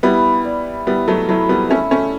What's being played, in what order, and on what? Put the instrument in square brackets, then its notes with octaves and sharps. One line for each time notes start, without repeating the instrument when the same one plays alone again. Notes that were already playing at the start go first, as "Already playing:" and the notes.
[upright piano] G3 B3 [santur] E4
[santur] D5
[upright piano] G3 B3 [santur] E4
[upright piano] F#3 A3
[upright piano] F#3 A3 [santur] E4
[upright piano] G3 B3
[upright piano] A3 C#4 [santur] E5
[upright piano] A3 C#4